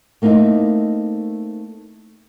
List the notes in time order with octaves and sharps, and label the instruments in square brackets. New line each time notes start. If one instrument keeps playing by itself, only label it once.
[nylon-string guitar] A3 A#3 C4 D#4 E4